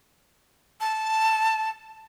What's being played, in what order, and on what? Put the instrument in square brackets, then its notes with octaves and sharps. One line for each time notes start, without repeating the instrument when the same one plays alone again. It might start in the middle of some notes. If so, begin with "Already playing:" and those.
[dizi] A5